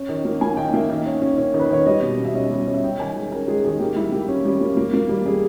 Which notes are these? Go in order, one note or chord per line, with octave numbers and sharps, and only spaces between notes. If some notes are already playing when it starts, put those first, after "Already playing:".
Already playing: C#4
D#3
A#3
A#3 G#5
D#3 G5
A#3 E5
D#3
C#4
C#4
C#4
D#3
B4
D#3 C#5
G3 D#5
B2
B2
E5
C#4 D#5
G3
C#4
E5
C#4 G5
D#3 G#5
G#3
C#4 A#4
G#3 G#4
D#3 G#4
A#3 G4
G3 E4
A#3 G4
C#4
G3
A#3
A#3
A#3
G3
G3 G#4